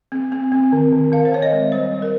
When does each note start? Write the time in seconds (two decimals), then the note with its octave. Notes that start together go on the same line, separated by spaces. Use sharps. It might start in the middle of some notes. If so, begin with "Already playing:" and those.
0.12 C4
0.32 C4
0.52 C4
0.72 D#3
0.92 D#3
1.12 D#3 F5
1.25 C5
1.32 C4 C#5
1.42 D#5
1.53 G#3
1.72 G3 C5
1.92 G3
2.02 A#4